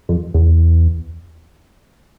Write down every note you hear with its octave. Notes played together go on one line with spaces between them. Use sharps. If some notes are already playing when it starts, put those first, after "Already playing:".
F2
E2